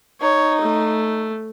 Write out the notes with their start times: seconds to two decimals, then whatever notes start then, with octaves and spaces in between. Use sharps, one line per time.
0.21 D#4 C#5
0.61 A3